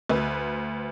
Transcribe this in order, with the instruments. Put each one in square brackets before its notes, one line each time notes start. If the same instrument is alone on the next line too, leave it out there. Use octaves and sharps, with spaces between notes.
[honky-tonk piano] D2 B4